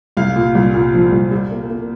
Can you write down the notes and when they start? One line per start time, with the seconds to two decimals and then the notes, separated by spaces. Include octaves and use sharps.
0.17 C2 F5
0.36 A#2
0.55 C2
0.74 A#2
0.94 F3
1.12 C2
1.31 G3
1.51 A#3
1.69 A#3